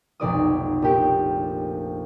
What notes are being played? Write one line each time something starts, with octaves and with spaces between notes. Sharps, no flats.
F1 B1 D5 D#6
A#1 G4 D7